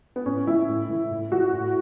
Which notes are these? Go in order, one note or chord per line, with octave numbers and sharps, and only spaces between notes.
B3
A2 C#4
E3 E4
A2
E3
A2
E3 F#4
A2